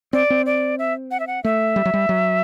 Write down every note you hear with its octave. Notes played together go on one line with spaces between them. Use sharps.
C4 D5
C4
D5
E5
F#5
E5
F#5
A3 E5
G3
F#3
G3
F#3